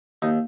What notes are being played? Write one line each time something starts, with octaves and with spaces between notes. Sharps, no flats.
D#2 D#4